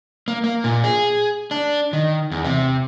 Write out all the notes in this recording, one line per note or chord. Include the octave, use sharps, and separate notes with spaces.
A#3
A#3
A#2
G#4
D4
D#3
E2
C3